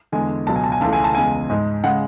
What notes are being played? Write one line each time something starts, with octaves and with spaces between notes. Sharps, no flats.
E2 D3 G#3 G#5
C#2 B2 F#3 A5
G#5
A5
G#5
C#2 C#3 E3 A3 A5
G#5
A5
E2 C#3 G#3 G#5
G#2 G#3
C#3 G#3 F#5